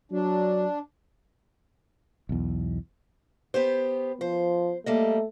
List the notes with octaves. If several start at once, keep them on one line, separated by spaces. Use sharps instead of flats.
F#3 D4
B1 E2
B3 G4 C5
F3 C5
G3 A3 A#3 D#5